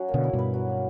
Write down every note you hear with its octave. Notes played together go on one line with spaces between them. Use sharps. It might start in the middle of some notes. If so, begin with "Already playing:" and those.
Already playing: F#3 C#4
A#3
B2 D3
E4
G2 B2
B4
F#3
A#3